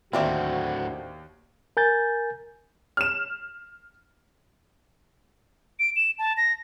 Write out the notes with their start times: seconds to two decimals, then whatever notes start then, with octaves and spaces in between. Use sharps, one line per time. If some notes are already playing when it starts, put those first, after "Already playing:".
0.13 D#2 A2 D3 A3 A#3 C4 F#4 D5
1.77 A#4 G#5 G6 A6
2.97 F6 E7
5.79 D7
5.96 E7
6.19 A5
6.37 A#6